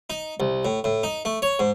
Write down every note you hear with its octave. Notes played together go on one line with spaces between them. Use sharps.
D#4
C2
A2
A2
D#4
A3
C#5
G#2